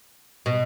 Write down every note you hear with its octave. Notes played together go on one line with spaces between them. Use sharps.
B2